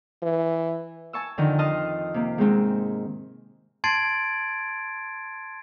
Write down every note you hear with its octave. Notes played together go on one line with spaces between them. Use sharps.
E3
G#5 A5 C#6 E6
F2 D3 D#3
D#5 A5 C6 D#6 F6
C3 A#3
G#2 D#3 G#3 C4
A5 C6 G#6 A6 C7 D7